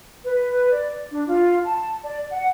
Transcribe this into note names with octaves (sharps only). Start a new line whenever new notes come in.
B4
D5
D4
F4
A5
D5
F#5